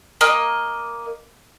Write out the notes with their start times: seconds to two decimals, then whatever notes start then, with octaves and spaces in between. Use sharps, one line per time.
0.21 A#3 D#5